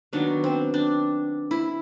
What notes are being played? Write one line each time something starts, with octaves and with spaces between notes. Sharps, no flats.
D#3 F#3 B3 D4
C4
D4
E4